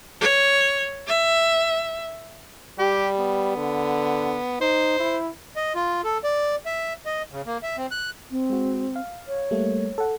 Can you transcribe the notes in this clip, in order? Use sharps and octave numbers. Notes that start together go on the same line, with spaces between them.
C#5
E5
G3 G4
B3
D3
D#4 C5
E4
D#5
F4
A4
D5
E5
D#5
C#3
A#3
E5
C4
F#6
C4
G#3 F#4
F5
C#5
G3 A3 A#3
A4 F#5